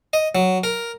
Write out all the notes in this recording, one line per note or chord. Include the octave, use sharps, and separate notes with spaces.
D#5
F#3
A#4